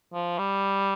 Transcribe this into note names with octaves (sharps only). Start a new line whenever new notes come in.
F3
G3